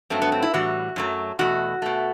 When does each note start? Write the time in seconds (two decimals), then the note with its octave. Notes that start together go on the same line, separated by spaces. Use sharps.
0.10 G2 F#3 A3 C4
0.22 B3
0.32 C4
0.42 E4
0.54 A2 E3 G3 F#4
0.96 F#2 F#3 A3
1.39 E2 B2 A3 F#4
1.82 B2 A3